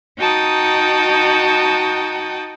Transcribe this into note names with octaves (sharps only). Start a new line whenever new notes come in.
D#4 F#4 G5 A5 D#6